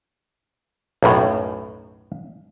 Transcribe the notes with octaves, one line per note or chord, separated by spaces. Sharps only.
B1 F#2 A2